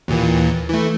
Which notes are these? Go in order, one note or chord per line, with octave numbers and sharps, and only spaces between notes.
D#2 A#2 E3
E3 A3